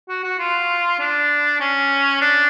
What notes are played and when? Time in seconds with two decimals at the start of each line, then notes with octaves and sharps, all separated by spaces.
0.09 F#4
0.24 F#4
0.39 F4
1.00 D4
1.60 C#4
2.21 D4